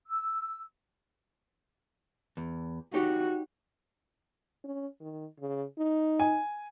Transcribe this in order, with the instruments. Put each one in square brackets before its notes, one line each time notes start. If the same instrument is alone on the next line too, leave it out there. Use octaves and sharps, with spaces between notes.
[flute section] E6
[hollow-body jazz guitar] E2
[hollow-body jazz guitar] D#4 G4 C#5 [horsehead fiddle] F#4
[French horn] C#4
D#3
C#3
D#4
[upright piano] G#5